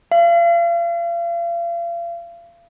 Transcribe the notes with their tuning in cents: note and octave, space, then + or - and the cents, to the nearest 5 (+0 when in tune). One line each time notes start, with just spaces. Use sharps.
F5 -40